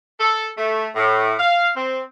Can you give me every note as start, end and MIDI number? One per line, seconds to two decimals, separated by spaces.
0.20 0.49 69
0.58 0.89 57
0.96 1.33 45
1.39 1.70 77
1.76 2.02 60